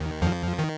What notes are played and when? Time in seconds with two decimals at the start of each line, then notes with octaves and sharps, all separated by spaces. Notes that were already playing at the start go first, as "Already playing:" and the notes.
Already playing: D#2 D#3
0.22 F2 F3
0.59 D#3